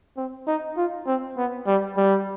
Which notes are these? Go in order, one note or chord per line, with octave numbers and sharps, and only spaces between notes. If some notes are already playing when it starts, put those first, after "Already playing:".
C4
D#4
F4
C4
B3
G3
G3